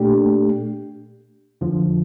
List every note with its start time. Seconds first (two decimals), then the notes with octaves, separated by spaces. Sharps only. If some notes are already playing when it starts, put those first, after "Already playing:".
Already playing: A#2 A3 D4 G4
1.61 F2 D3 F3